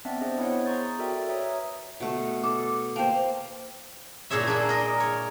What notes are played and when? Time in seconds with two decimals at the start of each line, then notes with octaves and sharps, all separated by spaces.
0.05 B3 C4 D4 D5 E5 A5
0.20 C4 G#4 C5 D#5
0.38 B3 E4 G#4 C5 C#5 F#5
0.66 A#5 C6 C#6 D#6 G6 A6
0.99 F#4 A4 A#4 D5 E5 G5
1.28 B4 C#5 E5 A#5 D#6
2.00 B2 A3
2.44 A4 D6
2.96 A#3 C5 G5 A5
4.30 A#2 E4 G#4 C#5 E5
4.47 A#3 D4
4.69 A#4 D#5
5.00 C#5